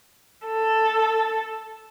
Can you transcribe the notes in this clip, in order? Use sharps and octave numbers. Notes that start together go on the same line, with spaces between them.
A4